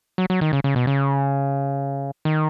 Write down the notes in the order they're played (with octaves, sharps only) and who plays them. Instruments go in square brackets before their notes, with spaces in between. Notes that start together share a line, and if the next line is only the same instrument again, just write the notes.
[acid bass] F#3
F#3
D#3
C#3
C#3
B2
C#3
D#3